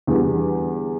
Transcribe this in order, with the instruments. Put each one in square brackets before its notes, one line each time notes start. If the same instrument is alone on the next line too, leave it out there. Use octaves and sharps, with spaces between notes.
[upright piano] E2 D3 G3 B3